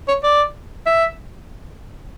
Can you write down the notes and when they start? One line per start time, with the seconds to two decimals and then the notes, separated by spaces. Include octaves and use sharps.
0.08 C#5
0.23 D5
0.86 E5